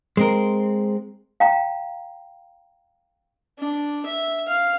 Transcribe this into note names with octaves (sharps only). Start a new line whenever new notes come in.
G#3 C4 A#4
F5 G5 A#5
D4
E5
F5